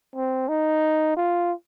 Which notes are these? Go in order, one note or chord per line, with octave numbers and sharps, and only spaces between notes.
C4
D#4
F4